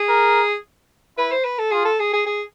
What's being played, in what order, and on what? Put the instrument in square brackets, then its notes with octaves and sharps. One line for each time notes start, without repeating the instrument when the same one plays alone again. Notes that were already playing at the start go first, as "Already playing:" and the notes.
Already playing: [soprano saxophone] G#4
[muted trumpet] A#4
[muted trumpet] E4 [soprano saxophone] B4
[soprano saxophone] C5
B4
A4
[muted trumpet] F4 [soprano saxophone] G#4
[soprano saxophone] A4
G#4
G#4
G#4